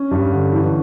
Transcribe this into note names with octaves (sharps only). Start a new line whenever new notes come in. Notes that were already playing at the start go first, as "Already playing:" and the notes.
Already playing: C#4
G2
D3
E3